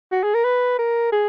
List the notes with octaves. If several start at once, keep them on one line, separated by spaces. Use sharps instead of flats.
F#4
G#4
A#4
B4
A#4
G#4